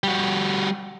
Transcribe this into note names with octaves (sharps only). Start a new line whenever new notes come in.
G3 F#4